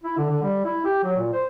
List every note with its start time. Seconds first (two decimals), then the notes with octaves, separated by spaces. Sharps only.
0.04 E4
0.17 D3
0.30 D3
0.43 G3
0.65 E4
0.85 G4
1.03 F#3
1.17 A#2
1.33 C5